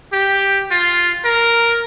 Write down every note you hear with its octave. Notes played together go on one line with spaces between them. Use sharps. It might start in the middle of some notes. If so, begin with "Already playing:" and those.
G4
F4
A#4